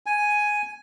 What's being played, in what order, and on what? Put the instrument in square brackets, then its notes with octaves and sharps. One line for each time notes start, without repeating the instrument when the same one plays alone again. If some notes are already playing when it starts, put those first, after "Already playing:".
[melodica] G#5